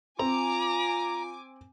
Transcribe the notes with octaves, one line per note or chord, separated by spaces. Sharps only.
C4 F4 G#5 A#5 D6